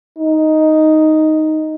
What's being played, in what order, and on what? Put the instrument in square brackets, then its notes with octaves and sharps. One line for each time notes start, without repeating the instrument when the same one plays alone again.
[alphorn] D#4